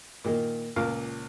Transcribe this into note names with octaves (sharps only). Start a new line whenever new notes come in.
A#2 D#3 A#3
C#2 A#2 A#4 F5